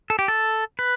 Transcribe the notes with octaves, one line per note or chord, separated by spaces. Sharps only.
A4
G4
A4
B4